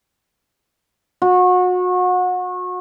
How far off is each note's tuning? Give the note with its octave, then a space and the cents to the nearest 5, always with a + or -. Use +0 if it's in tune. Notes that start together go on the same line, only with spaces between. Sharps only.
F#4 -30